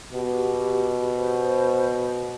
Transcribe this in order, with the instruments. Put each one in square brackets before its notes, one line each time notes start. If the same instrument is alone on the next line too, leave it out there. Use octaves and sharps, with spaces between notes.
[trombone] B2 [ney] G4
[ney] C5